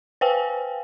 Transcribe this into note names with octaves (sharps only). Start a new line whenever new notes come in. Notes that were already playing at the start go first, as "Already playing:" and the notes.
B4 C5 F5 G5 G#5